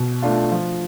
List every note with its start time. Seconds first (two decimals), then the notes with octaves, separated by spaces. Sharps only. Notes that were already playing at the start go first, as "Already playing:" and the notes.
Already playing: B2
0.22 A3 D4 F4
0.51 F3